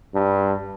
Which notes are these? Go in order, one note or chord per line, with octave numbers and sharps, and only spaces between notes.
G2